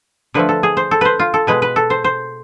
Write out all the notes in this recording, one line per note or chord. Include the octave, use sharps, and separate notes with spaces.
D3 F3 A3 B4
A4
G#4
C5
A4
B4 C5
F4
A4
B2 G#3 B4
B4
A4
C5
C5